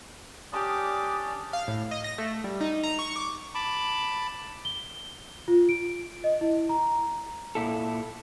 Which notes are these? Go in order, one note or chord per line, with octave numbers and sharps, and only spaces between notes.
C#4 D4 G4 D5 D6 D#6
F5
A2
D#5
A#6
A3
G3
D#4
A#5
C#6
D6
A5 B5 D6
G7
F4
D7
D#5
E4
A#5
A#2 E4 A4